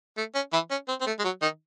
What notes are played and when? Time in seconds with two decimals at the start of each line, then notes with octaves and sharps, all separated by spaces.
0.17 A3
0.35 C#4
0.53 E3 E4
0.71 C#4
0.88 C4
1.01 C4
1.07 A3
1.19 G#3
1.24 F#3
1.42 D#3 D#4